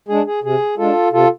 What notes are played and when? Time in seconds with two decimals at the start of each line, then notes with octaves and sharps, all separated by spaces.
0.08 G#3 D4 G#4
0.26 G#4
0.43 C3 G#4
0.77 G#3 D4 F4 A4
1.12 C3 F4 A4